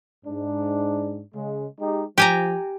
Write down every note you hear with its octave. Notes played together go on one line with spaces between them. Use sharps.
G#2 D4
C#3 G#3
G#3 D#4 G4
F3 G4 G#5 A#5